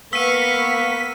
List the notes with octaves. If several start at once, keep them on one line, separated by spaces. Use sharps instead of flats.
A#3 B3 B4 F5 C#6 E6 B6 D#7